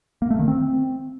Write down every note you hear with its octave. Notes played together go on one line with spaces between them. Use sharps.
A#3
A3
D#3
C4